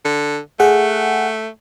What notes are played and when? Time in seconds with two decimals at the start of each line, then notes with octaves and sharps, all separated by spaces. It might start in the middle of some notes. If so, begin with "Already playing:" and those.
0.05 D3
0.60 A3 G#4 F#5